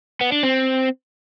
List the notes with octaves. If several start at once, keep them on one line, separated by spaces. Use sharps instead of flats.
B3
D4
C4